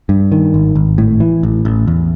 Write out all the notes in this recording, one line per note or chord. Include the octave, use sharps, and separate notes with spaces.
G2
D#3
G#1
G#1
A2
E3
A1
A1
E2